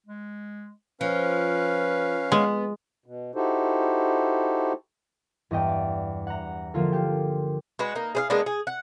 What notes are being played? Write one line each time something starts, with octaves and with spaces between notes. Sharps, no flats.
G#3
F3 C#4 B4 F5
G#3 B3
B2
D#4 E4 F#4 G4 A4 C5
E2 G2 D#5 G5
D5
F#5 A#5
D3 F3 A#3 F4 A4
G4 G5
G#3 F#4 B4
A#3 D#4
G#4 C5 F5
G#3 A#3 B3 D4
G#4
F#5